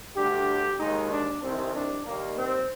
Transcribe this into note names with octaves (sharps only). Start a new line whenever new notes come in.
D2 D3 G3 G4
D#2 D#3 G#3 D#4
D4
C2 C3 D#3 C4
D4
D#2 D#3 G3 A#3
C4